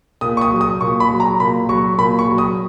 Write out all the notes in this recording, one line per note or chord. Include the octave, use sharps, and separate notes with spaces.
A#2 D#6
C#6
D#6
F#3
D#6
A#2 C#6
B5
F#3
A#5
A#2 B5
F#3 C#6
A#2 B5
C#6
F#3
D#6